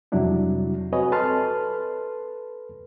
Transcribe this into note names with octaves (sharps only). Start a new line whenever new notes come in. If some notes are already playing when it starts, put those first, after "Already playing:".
F2 C3 F#3 G3 D4 E4
C4 F#4 B4 C#5 D#5 G#5
A4 B4 A5 C6 F6